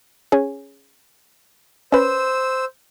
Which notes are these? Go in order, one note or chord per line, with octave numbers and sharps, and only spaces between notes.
C#4 G#4
C#4 B4 C5 E6